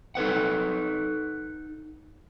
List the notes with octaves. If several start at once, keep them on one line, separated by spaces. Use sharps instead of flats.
D#4 A4 B4 F#5